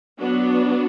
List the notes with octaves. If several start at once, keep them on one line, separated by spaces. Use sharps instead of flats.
F#3 B3 D4 F#4